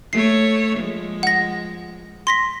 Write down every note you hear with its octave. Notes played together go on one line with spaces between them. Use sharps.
A3 C#5 C7
F3 G#3
F#5 A#6
C6 A#6 B6